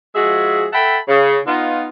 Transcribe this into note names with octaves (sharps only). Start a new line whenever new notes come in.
F3 G#3 F#4 G#4 E5
A4 E5 F#5 G5 A5 B5
C#3
B3 D#4 F4